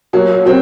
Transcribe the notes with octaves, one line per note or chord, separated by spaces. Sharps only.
F#3 A#3
F#3 C4